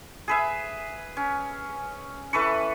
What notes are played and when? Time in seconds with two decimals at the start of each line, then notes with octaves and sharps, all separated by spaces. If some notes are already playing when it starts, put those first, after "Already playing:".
0.28 G#4 B4 E5
1.17 C#4
2.33 E3 A4 B4 C#6